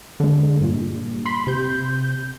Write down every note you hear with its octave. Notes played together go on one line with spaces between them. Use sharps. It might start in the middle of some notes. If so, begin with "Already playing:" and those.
D3 G#3
G2 A#2
B5 C6
C3 G6